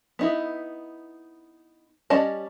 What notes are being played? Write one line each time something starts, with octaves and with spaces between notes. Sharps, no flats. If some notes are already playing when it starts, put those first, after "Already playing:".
B3 D#4 E4
G3 C#4 D5 D#5 A5